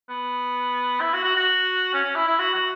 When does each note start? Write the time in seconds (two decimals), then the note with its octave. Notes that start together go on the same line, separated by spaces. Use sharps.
0.10 B3
1.01 E4
1.13 F#4
1.24 F#4
1.36 F#4
1.93 C#4
2.04 C#4
2.15 E4
2.27 E4
2.39 F#4
2.54 F#4